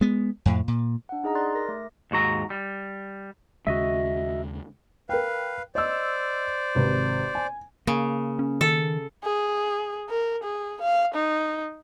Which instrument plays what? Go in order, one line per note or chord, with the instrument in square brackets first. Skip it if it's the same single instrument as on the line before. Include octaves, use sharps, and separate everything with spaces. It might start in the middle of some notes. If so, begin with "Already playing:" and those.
[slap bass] G#3 B3
F2 A2
A#2
[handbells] D4 F#5
D#4 G#4 D#5 A#5
D5 C6 F#6 A6
A#4 A#6
A3 D6
[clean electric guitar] D#2 G#2 F#4 A#5
G3
[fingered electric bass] D#2 C#3 G#3 [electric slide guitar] F#4 D#5 E5
[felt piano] A#4 G5 [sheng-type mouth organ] B4 F5
[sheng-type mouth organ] C5 D5 [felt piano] D#5 E6
[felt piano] G#1 C3 B4
G#5
[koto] C#3 [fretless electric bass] A#3
[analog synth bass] C#4
[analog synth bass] D#3 [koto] A4
[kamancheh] G#4
A#4
G#4
F5
D#4